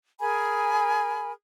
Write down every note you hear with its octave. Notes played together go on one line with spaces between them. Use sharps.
G#4 A#4 G#5 B5